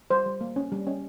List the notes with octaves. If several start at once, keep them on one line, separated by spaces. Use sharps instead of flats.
G3 C5
G3
A#3
C#4
G3
C#4